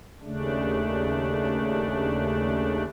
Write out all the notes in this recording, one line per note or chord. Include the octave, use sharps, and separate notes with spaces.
D#2 C#3 A3 D4